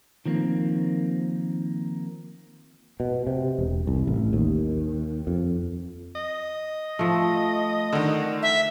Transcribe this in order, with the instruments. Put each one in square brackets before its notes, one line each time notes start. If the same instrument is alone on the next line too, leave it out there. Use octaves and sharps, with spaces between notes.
[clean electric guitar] D#3 F3 A#3 C4
[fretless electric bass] B2
C3
E1
C2
A1
D#2
F2
[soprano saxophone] D#5
[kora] F3 A3
[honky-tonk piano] D3 D#3
[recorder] E5